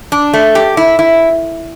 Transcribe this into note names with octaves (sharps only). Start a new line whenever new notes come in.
D4
A3
G4
E4
E4